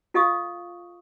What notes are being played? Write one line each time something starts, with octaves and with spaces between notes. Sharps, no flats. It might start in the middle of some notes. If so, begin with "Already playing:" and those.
F4 A4 D#5 F5 C#6 D#6